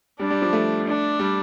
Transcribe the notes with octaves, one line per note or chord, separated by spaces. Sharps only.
G3 D4
G3
F3
A3
D4
G3